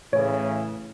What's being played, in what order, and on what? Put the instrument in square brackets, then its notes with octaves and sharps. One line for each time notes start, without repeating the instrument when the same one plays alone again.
[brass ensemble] A2 C#3 E3 [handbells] C#5